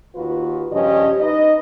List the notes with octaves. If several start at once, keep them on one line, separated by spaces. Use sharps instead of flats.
D#2 F4 F#4 B4
G2 C#3 F3 C#4 G4 D#5
D#4 B4 D#5